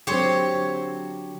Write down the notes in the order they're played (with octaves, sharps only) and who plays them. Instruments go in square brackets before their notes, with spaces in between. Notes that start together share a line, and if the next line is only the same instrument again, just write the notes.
[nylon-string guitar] D3 F#3 C4 [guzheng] G4 C5 C#5